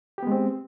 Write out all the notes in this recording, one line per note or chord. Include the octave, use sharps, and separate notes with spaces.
G#3 B3 C4 G4